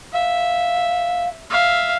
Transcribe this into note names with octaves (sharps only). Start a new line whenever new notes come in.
E5 F5
E5 F5